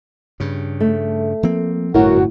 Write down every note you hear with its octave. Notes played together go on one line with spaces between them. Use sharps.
G2 C#3
A3
F3 A#3 C4
G1 F#2 A2 F#4 A#4